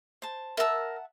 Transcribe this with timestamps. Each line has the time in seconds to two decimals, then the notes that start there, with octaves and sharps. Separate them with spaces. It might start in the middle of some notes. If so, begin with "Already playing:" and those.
0.22 C5 A5
0.57 A#4 E5 F#5 A5 E6